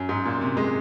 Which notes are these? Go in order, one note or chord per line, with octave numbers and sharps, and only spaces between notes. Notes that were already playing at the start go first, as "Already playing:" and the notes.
Already playing: F#2
G#2
A#2
C3
G#3